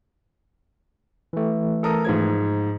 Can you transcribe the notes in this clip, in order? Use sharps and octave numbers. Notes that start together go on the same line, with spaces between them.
E3 A3
A4 A#4 D#6
G#2 F3 G#6